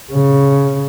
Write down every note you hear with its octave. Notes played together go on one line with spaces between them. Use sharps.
C#3